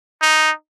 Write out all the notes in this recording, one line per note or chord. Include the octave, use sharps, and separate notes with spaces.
D#4